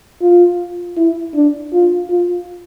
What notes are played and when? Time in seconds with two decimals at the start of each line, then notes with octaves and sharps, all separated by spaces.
0.22 F4
0.97 E4
1.35 D4
1.73 F4
2.10 F4